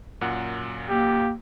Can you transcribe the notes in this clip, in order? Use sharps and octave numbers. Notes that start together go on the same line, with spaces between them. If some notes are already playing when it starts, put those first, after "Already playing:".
F#2 A#2 F#5
A#3 G4